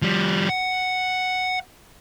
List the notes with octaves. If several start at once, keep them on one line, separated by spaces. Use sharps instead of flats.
F3 G3
F#5